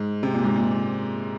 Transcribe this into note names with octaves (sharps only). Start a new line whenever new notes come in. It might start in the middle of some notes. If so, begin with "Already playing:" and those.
Already playing: G#2
C3
A#2
G#2
A#2